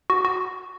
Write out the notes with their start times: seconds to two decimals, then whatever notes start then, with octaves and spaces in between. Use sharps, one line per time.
0.10 F#4
0.25 F#4